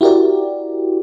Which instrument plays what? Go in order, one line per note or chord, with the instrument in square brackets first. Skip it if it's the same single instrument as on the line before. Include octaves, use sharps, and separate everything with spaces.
[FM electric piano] E4 F#4 G4 A#4 D5